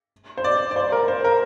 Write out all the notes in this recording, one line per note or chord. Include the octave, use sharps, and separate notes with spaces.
C5
D5
D5
C5
A#4
C5
A#4